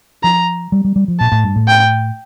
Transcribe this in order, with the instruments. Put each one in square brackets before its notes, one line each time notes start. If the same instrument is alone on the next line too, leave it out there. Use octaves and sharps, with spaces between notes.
[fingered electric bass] F3 [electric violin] A#5
[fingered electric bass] G3
G3
G3
F3
[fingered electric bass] A#2 [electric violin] A5
[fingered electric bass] A2
G2
A2
[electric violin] G5